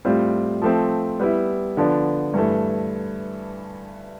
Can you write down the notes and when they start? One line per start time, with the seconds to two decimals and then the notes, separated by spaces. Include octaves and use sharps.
0.05 A2 G3 C4 F4
0.62 F3 A3 C4
1.20 G3 B3 E4
1.77 D3 F3 B3 D4
2.34 G2 E3 A3